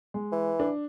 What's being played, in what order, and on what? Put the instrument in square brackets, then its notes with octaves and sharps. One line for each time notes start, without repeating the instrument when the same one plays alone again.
[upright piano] G#3
[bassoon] E3
[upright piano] D4